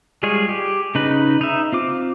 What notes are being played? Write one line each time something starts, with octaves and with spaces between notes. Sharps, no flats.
G3 G#3 F4 G#4 C#5
G4
C#3 D#4 B4
D#4 E5
C4 F4 D6